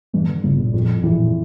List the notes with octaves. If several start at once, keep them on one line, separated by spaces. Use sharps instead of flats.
G2 E3
D3
G1 C#3
A#2
F2 A#2
A2
E3
A#2